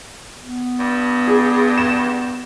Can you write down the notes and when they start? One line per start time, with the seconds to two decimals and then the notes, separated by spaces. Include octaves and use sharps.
0.41 B3
0.79 G2
1.28 G#4
1.78 E7